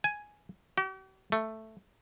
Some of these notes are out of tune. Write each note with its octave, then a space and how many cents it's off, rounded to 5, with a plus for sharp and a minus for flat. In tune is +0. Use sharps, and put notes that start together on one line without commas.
G#5 +5
G4 -45
A3 +5